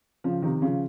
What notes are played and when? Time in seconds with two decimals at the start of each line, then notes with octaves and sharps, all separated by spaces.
0.24 C#3 F3
0.42 C3 D#3
0.62 C#3 F3